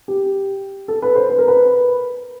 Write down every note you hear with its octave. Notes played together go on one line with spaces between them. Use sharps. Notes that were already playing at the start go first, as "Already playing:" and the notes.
G4
A4
B4
C5
B4
A#4
B4